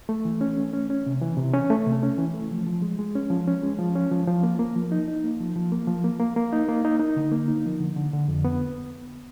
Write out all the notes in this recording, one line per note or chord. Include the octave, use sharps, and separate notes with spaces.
A3
E3
C#4
A3
C#4
C#4
C3
E3
C3
C#4
A3
C3
C#4
E3
A3
F3
F3
G#3
G#3
C#4
F3
C#4
G#3
F3
C#4
F3
F3
A#3
A#3
F3
D#4
D#4
A#3
F3
F3
A#3
F3
A#3
A#3
A#3
D#4
A#3
D#4
D#4
D3
A#3
D#4
F3
D3
D3
D3
F2
B3